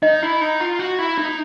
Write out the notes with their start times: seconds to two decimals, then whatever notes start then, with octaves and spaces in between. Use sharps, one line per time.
0.03 D#4 D#5
0.22 E4
0.41 D#4
0.60 F4
0.79 F#4
0.99 E4
1.18 D#4